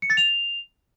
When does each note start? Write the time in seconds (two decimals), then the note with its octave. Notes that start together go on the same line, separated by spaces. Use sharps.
0.02 C#7
0.10 A6
0.17 F7